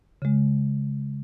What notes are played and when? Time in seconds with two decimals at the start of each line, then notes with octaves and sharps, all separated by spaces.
0.22 C#3 G#3